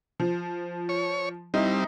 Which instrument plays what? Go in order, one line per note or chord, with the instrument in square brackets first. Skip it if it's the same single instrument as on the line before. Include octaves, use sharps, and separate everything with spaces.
[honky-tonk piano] F3
[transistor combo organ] C#5
[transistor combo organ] G3 C4 [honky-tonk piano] D#4 E4